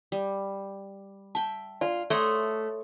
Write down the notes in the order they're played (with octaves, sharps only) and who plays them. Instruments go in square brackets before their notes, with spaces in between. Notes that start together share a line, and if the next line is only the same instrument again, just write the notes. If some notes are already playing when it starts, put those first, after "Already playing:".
[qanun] G3
[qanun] E5 G5 [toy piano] A5
[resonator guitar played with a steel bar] F4 [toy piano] D5
[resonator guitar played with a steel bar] A3 [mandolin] C#5 C6 D#6 [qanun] D#5 F#5